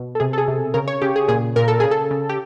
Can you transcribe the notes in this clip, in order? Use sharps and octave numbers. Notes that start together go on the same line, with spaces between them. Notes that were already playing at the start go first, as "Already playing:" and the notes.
Already playing: B2
A4
C3 G#4
A4
G#4
C3
C#3 A#4
C#5
C#3 G4
G#4
A#2 G#4
A#2 A#4
A4
C#3 G#4
A4
C#3
G4